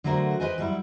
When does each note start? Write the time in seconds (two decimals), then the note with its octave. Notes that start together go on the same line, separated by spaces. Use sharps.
0.04 D3 F#3 A3 F#4 A#4 C5
0.40 G4 G#4 B4 C5 D#5 G#5
0.58 F#3 G3 E4